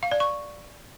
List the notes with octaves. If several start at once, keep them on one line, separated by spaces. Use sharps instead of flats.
F5
D5
C#6